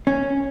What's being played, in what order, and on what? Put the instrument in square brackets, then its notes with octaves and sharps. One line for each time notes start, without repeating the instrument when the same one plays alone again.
[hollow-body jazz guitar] C#4